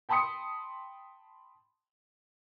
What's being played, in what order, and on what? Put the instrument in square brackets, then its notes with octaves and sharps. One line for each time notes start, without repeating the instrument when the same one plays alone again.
[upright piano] G5 A5 B5 C6 D#6 C#7